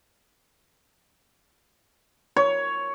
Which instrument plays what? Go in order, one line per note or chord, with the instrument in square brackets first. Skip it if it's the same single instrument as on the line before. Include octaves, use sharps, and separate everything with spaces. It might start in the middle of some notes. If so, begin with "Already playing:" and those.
[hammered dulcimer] C#5